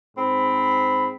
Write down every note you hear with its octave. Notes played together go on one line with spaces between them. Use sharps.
G#2 C4 B5